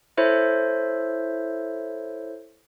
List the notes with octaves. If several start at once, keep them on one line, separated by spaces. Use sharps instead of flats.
E4 A4 C5 C#5 E5